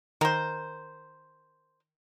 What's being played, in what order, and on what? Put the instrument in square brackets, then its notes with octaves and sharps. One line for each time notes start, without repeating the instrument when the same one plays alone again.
[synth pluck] D#3 [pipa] A#4 C5